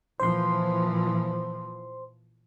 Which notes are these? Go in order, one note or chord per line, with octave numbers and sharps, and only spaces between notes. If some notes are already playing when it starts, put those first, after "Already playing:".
A#2 E3 F3 C5 C6